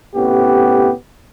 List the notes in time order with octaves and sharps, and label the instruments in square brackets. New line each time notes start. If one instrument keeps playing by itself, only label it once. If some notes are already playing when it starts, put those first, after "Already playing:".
[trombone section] A2 C3 B3 C#4 G4